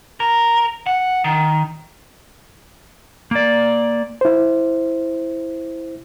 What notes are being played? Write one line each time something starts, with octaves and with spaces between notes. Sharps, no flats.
A#4
F#5
D#3
A#3 D5
E4 C5